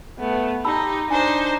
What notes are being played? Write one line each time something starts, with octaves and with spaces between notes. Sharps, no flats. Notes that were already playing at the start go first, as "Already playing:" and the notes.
A3 B3
D#4 G4 A5 B5 E6
D4 D#4 C5 G#5